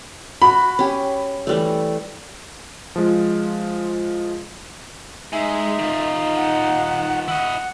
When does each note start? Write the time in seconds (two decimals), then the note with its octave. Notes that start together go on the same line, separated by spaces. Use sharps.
0.42 F#4 B5
0.79 C#4 G4
1.47 E3 G3 A3
2.96 F3 G#3 F4
5.33 G#3 D#4 E5
5.79 D#3 F4
6.36 F#5
7.28 E4 D#5 F#5